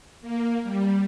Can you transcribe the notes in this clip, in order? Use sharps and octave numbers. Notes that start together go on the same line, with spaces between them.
A#3
G3